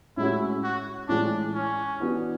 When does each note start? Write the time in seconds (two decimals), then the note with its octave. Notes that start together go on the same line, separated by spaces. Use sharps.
0.17 A2 G#3 C#4 E4 F#4
0.63 F#4
1.08 A2 E3 G#3 D4
1.54 C#4
2.00 E3 B3 D4 F#4